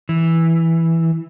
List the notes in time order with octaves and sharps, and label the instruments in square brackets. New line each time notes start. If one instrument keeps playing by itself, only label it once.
[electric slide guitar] E3